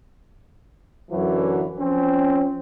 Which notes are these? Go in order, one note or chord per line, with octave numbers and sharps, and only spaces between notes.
F#2 D3 E3 F#3
F3 C4 C#4